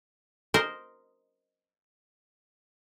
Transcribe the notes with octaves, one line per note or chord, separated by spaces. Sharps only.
A#4 C5 D#5